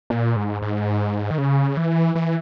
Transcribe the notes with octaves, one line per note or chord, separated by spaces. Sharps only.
A#2
G#2
G#2
D#3
C#3
E3
E3